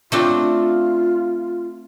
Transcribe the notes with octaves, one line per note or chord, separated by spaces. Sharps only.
A3 C4 D4 F4